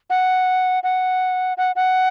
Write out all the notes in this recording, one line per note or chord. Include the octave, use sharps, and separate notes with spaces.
F#5
F#5
F#5
F#5